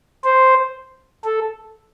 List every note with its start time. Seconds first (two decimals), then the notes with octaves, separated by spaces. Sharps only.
0.24 C5
1.25 A4